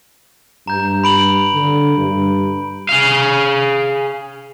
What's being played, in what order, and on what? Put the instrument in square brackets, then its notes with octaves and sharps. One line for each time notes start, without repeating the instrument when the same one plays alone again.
[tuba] G2 [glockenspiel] A#5 G6
[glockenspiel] B5 D7 F#7
[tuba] D3
G2
[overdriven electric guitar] G#4 F5